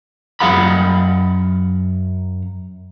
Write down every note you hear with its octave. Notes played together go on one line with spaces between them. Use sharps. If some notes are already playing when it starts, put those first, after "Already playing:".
F#2 F5 F#5 B5